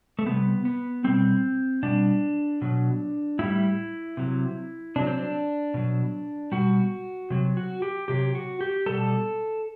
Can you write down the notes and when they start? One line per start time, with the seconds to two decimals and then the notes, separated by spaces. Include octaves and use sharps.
0.19 A3
0.26 C3 G3 B3
0.65 B3
1.04 B2 G3 C4
1.83 B2 G3 D4
2.62 B2 F#3
3.39 A2 G3 E4
4.17 C3 F#3
4.96 C3 F#3 D4
5.07 C4
5.18 D4
5.74 B2 F#3
6.52 B2 G3 F#4
7.30 C3 F#3
7.57 F#4
7.82 G4
8.08 C3 F#3 G4
8.35 F#4
8.61 G4
8.86 B2 G3 A4